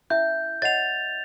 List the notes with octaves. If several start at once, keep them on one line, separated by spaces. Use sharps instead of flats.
C#4 E4 E5 G6
C#5 D#5 F#5 A6 F7